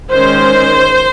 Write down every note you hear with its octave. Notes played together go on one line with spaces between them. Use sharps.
D#3 G#3 C#4 C5